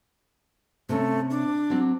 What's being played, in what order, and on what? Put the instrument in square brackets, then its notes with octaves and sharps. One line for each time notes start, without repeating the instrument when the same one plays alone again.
[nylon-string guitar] C3 C#4 [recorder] A3
[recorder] D4
[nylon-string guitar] F#3 C4